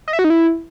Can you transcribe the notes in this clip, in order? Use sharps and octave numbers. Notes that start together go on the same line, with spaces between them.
D#5
E5
F#4
D#4
E4